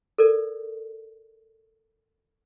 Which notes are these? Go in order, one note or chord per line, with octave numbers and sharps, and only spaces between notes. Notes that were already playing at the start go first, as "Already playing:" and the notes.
A4 A#4 D5